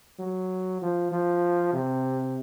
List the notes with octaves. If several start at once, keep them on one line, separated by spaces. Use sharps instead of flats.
F#3
F3
F3
C3